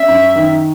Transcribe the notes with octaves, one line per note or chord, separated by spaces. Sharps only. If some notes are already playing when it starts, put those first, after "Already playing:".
Already playing: C#4 E5
F#2
D#3